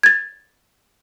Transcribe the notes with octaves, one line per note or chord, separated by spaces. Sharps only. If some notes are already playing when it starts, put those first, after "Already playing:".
G#6 A6